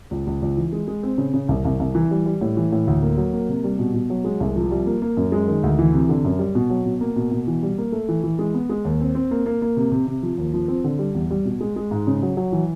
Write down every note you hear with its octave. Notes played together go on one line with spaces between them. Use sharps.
C#2
C#2
C#2
E3
G#3
G#3
C4
C#3
C#3
C2
C2
C2
E3
G3
G3
A2
E3
A2
D2
A#3
F#3
A#3
C3
G3
B2
B2
F#3
G#3
C2
F3
G3
A#3
A#3
F#2
G#3
D#3
D2
E3
C3
D3
F#2
G3
B2
F#3
B2
A#3
B2
B2
E3
G3
A#3
A3
E3
E3
G#3
B3
G#3
D#2
C4
C4
A#3
A#3
A#3
C3
C3
C3
F3
D#2
F3
C4
D3
G3
E2
G3
B2
G#3
G#3
G#2
C#3
F#3
F#3
E3